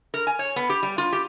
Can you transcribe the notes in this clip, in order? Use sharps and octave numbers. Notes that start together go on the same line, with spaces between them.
A#4
G#5
C#5
B3
G4
G3
F4
G4